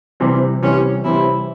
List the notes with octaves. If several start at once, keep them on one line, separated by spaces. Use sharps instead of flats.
C3 E3 G3 C4
C3 E3 G3 C4 C#4
C3 E3 G3 C4 E4